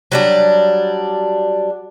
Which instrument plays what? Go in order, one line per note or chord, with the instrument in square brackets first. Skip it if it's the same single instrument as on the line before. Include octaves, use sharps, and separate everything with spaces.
[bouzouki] F#3 G3 D4